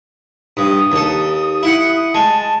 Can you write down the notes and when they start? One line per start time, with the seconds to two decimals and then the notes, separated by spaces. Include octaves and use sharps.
0.57 G2 D#6
0.92 D#2 A4
1.63 E4 F#5
2.15 G#3 A5